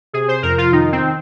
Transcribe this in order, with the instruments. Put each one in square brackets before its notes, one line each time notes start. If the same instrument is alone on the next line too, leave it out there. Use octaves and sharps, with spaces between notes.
[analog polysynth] C3 G#4
C5
F2 A#4
F4
D#3 D#4
C4